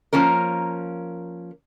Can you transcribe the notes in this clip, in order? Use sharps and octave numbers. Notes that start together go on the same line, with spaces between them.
F3 A#3 C#4 A#4